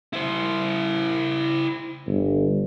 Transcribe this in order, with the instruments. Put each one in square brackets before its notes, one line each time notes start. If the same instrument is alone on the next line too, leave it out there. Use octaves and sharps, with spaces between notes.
[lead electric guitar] E4 C5
[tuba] G1